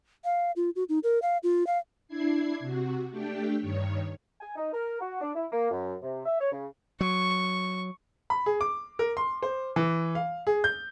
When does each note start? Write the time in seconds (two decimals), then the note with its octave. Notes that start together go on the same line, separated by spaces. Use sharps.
0.25 F5
0.56 F4
0.76 F#4
0.89 D#4
1.04 A#4
1.22 F5
1.43 F4
1.67 F5
2.08 D4 E4 G#6 C7
2.60 C3 F#4
3.11 A3 D4 G4 G5
3.59 G2 D#3 C#5
4.41 G#5
4.56 D#4
4.73 A#4
5.01 F#4
5.21 D4
5.35 E4
5.52 A#3
5.71 F#2
6.03 C3
6.25 E5
6.41 C#5
6.52 C#3
7.01 F#3 C#6
8.30 B5
8.46 G#4
8.61 D6
8.99 A#4
9.17 C6
9.43 C5
9.76 E3
10.15 F5
10.47 G#4
10.64 G6